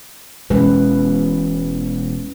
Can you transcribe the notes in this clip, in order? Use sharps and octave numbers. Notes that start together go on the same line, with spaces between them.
E1 B2 E3 G#3 C#4 B4